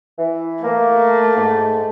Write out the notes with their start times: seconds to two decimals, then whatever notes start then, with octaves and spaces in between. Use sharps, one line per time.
0.18 E3
0.64 A3 A#3
1.36 G#2